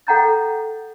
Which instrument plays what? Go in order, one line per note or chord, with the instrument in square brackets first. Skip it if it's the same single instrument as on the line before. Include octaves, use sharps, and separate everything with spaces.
[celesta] A4 F#5 G5 A#5 G6 A6